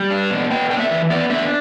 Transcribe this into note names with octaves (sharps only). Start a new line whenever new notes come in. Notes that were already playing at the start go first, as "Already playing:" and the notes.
Already playing: G3
D4
B2
B3 G5
D4 G5
E5
E3
B3 D5
D4 E5